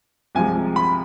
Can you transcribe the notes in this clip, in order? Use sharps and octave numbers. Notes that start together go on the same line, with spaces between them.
C2 C3 F3 G#3 G#5
B5